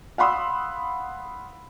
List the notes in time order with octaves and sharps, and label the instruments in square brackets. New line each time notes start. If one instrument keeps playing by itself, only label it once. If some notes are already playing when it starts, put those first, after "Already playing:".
[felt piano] F5 F#5 B5 C6 D#6 E6